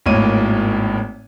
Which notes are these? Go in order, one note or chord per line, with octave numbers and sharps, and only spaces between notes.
G#1 A2 A#3 C#5 D#7